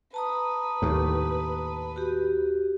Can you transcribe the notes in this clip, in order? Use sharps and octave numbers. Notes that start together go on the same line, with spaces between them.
B4 A5 A#5 D#6
D#2 A2
F#4 G4